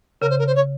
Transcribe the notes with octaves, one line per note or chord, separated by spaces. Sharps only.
C#3 A#4
C5
A#4
C5
C#5